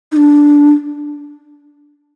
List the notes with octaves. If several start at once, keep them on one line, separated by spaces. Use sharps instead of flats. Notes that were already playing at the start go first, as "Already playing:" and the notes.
D#4
D4